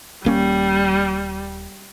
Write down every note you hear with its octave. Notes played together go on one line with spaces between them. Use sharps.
D#1 G3 A#3 C#4